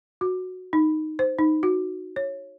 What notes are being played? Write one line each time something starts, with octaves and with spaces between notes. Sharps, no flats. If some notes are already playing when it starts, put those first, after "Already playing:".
F#4
D#4
C5
D#4
F#4
C#5